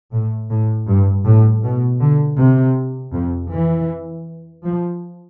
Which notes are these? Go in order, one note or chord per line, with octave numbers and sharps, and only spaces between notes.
A2
A2
G2
A2
B2
D3
C3
F2
E3
F3